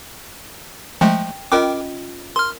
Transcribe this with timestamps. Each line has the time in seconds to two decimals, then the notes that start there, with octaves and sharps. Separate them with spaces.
1.01 F3 G#3 A3 G5
1.52 C#4 F4 A#4 D#5 G5 D6
2.36 A#4 C6 F6